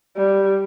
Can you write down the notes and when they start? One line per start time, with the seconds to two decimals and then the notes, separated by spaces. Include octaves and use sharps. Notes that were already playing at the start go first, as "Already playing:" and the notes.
0.16 G3